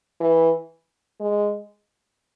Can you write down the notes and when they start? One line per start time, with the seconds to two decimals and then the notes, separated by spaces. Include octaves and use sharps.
0.20 E3
1.21 G#3